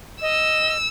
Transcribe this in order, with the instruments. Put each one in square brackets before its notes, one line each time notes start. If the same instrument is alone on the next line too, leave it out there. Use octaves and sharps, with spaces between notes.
[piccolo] D#5 [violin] E6